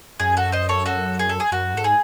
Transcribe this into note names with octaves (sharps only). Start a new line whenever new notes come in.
F#2 G#4
F#4 A4
C5 D#5
A4 C#5
F#4 A4
G#4
A4
G#4
F#2 F#4
G#2 A4
G#4